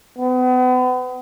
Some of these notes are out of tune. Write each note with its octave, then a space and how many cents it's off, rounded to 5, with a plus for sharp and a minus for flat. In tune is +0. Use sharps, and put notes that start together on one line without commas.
B3 +35